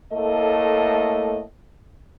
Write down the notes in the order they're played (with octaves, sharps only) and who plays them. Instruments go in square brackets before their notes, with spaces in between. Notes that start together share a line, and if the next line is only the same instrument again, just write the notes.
[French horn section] A2 A3 A#3 A4 D#5